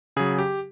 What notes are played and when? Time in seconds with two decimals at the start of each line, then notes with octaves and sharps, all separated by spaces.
0.16 C#3 F#3 G#4
0.39 G4